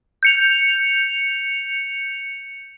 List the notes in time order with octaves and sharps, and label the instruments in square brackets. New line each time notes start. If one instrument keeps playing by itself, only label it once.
[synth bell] G6 C#7 F7